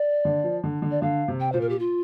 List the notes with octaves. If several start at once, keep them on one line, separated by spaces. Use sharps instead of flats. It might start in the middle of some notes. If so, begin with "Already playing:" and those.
Already playing: D5
D3
F3
D3
D3
D5
D3 F5
C3
G5
A#2 C5
A#4
G4
F4